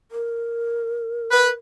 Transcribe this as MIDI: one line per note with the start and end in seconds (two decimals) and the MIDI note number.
0.12 1.54 70
1.30 1.49 71